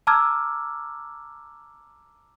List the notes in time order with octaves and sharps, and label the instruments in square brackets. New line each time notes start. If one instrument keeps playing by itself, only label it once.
[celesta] A5 A#5 D6 E6 F6 G#6